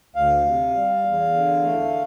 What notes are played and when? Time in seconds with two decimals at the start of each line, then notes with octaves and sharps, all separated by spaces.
0.15 D2 F5
0.45 C3
0.75 G3
1.05 E2
1.34 D3
1.64 A3